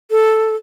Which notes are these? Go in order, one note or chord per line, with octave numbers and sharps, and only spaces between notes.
A4